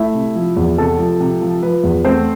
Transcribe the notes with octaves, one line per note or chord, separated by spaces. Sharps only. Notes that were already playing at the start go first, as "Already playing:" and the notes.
Already playing: A3 E4 E5
C3
F3
E2
C3 A4
F3
C3
F3
F3 B4
E2
A3 C4 C5